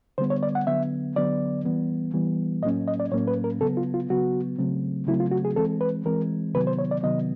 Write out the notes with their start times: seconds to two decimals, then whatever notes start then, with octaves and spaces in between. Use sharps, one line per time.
0.18 D3 G3 B3 C5
0.30 C#5
0.43 D5
0.55 F#5
0.67 D3 F#3 B3 E5
1.16 D3 F#3 B3 D5
1.65 E3 G3 B3
2.14 E3 G3 B3
2.63 A2 F#3 A#3 C#4 D#5
2.88 D#5
3.00 D5
3.12 A2 F#3 A#3 C#4 C#5
3.28 B4
3.44 A#4
3.61 C#3 F#3 B3 A4
3.77 F4
3.94 F4
4.10 C#3 F#3 B3 F#4
4.58 C#3 F#3 A3 C4
5.07 C#3 F#3 A3 C4 E4
5.20 F4
5.31 F#4
5.45 G#4
5.56 E3 G#3 C4 A4
5.81 B4
6.05 E3 G#3 C4 A#4
6.54 C3 D#3 F#3 B3 B4
6.67 C5
6.79 C#5
6.91 D5
7.03 C3 D#3 F#3 B3 D#5